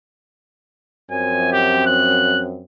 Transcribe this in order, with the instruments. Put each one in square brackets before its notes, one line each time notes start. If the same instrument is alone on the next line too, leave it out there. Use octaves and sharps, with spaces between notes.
[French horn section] F#2 F3 C4 [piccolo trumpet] G#5
[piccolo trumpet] G4
F#6